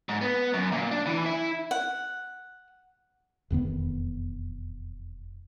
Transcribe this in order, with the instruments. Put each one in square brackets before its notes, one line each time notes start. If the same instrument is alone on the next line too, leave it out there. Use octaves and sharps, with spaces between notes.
[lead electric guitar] G#2
B3
F#2
A#2
D4
E3
E4
[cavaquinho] F#5
[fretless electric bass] E1 F2 D#3 B3